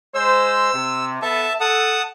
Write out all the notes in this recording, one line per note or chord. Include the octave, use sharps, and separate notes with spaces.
G#3 C5 E6
C3
B3 A4 E5 A5
A4 F#5 A5 D#6